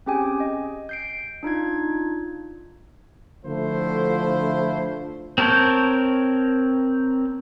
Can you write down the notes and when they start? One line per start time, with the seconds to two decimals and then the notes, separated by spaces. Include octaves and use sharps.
0.06 C4 C#4 G4 G#4 G5 G#5
0.40 D#5
0.89 G6 C7 D7
1.43 D4 D#4 F4 G#6
3.44 D3 F3 A3 E4 C5
5.38 C4 A#4 C#5 A5 G6